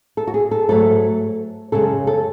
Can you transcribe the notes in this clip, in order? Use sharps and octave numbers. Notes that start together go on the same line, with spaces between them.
A4
F#4
G#4
A4
G#2 F#3 A3 A4
F#2 C#3 G#3 A4
A4